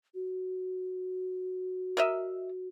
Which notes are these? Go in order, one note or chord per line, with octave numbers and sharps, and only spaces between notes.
F#4
A#4 D#5 E5